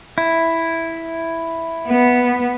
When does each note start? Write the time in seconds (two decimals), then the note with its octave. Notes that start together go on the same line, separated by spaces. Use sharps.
0.18 E4
1.87 B3